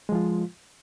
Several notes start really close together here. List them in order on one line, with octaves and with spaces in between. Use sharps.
G#3 F3 F4